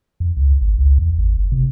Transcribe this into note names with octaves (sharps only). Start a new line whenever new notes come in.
F2
C#2
G#1
C#2
E2
G#1
F#1
C3